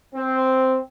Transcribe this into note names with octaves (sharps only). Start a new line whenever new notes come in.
C4